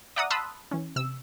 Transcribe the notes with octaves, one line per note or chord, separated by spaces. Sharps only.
D5 E5 F#5 A#5 D#6
A5 B5 C6 D#6 E6 F#6
E3 C#4
C3 E6